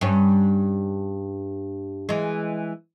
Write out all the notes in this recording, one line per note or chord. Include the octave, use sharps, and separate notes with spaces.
G2 C#4
E3 G#3